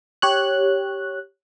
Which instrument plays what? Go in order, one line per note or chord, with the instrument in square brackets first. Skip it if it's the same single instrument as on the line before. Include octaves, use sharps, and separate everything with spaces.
[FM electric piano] G4 C#5 F#6